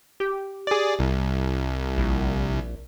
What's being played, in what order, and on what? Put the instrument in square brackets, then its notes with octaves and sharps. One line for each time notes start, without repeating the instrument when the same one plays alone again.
[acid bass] G4
[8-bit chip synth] G#4 D5
C2
[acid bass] A#1